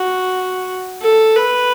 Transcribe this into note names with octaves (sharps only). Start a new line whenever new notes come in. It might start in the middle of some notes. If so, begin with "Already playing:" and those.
Already playing: F#4
A4
B4